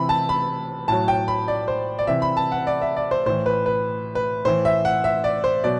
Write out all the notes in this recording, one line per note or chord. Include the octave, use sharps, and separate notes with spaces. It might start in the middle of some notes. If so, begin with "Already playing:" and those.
Already playing: C3 E3 B5
A5
B5
A2 F#3 A5
G5
B5
D5
C5
D5
C3 E3 E5
B5
A5
F#5
D5
E5
D5
C5
A2 E3 C5
B4
B4
B4
A2 E3 C5
E5
F#5
E5
D5
C5
B2 F#3 D5